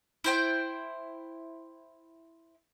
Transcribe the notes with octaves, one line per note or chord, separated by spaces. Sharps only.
E4 C5 G5